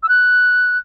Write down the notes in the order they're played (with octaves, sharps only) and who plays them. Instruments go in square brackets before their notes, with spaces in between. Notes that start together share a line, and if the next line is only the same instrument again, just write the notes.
[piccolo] E6
F#6